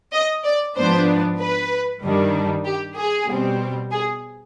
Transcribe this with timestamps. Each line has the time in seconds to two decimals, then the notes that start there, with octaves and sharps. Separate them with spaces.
0.13 D#5
0.45 D5
0.76 G#2 F3 B3 D4 C5
1.40 B4
2.02 G2 D#3 G3 D4
2.65 G4
2.96 G#4
3.27 B2 G3 C4
3.91 G#4